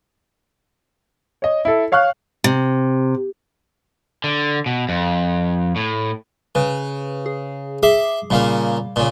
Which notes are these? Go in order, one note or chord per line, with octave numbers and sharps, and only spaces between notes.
C#5 D#5
E4 A4
C#5 F5 C#6 F6 F#6
C3
D3
B2
F2
A2
C#3 B4
G#4
G#4 E5 C6 D6
A#2 C#3 G3 A#3 F5
A#2 C#3